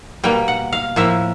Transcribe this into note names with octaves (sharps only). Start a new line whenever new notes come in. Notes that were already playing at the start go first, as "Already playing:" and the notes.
B2 G3 A#3 G5
F#5
F5
A2 F3 A#3 E5